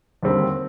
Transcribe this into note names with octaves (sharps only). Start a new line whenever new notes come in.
D#2 D3 G3 C4